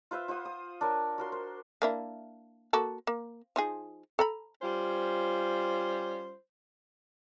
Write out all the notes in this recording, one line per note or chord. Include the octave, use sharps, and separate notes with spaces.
F4 B4 C5 E5
F4 C5 F#5 D#6
D#6
D4 A#4 C#5
F#4 A#4 C6
C5
A#3 D4 E4
A#3 F#4 A4
A#3
F3 D#4 G#4
A4 A#5 B5
G3 C#4 F4 C5